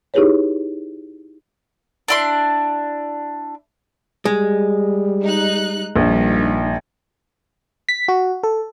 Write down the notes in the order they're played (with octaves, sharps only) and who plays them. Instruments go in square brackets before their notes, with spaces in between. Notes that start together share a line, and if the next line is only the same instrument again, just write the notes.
[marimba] D#4 E4 G4 G#4 B4 C#5
[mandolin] D4 E4 C6
[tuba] G3 [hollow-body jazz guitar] G#3
[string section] D#4 F#6
[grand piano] A#1 [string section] G2 D#3 F3
[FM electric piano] B6
F#4
A4